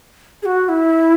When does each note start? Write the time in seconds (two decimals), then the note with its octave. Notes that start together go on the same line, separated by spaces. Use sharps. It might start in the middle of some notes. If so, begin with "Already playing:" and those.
0.42 G#4
0.46 F#4
0.69 E4